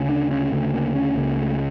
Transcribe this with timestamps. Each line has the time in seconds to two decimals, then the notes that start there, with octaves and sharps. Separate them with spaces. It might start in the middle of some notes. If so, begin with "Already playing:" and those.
Already playing: D2 C#3
0.09 D4
0.31 C#4
0.52 D2 C#3 A3
0.74 A#3
0.95 C#4
1.16 C#2 C#3 A#3
1.38 A3